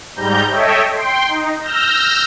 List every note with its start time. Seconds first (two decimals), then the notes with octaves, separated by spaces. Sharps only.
0.16 G#2 G3 A#5 G6
0.50 A4 C#5 D#5 E5 G5
0.94 G5 C6
1.28 D#4
1.61 E6 F6 G6 A#6